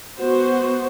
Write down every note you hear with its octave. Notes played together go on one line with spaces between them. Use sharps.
B3 F#4 C5